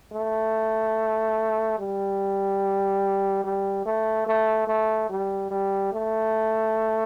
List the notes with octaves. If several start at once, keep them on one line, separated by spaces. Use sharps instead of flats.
A3
G3
G3
A3
A3
A3
G3
G3
A3